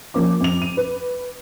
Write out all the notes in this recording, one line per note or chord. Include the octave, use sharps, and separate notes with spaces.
F3 A#3 C#4 D6
F2 F7
D#7
B4